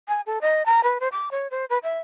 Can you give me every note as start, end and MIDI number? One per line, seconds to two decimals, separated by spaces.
0.08 0.21 80
0.26 0.39 69
0.41 0.65 75
0.66 0.83 82
0.84 0.98 71
1.00 1.08 72
1.12 1.29 86
1.31 1.47 73
1.51 1.65 72
1.70 1.78 71
1.83 2.00 76